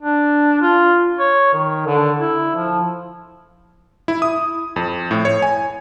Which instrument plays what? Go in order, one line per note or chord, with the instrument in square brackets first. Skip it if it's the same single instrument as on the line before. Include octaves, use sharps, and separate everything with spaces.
[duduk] D4
F4
C#5
D#3
D3
E4
F3
[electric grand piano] E4
D#6
F2
A2
C#5
G#5